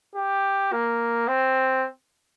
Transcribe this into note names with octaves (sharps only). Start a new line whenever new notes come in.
G4
A#3
C4